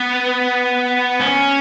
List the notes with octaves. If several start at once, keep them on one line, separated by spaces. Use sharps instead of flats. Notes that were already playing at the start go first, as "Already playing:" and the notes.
Already playing: B3
C#4